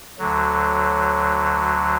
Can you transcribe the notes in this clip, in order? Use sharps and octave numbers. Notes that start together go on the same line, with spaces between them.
D2 D3 F#3